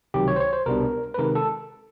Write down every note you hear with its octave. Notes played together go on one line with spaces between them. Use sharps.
C#2 C3 D#3 F#3 G4
C#5
C5
C#5
C5
C2 B2 G3 B3 D4 A#4
B4
C3 D#3 G#3 A#4
A4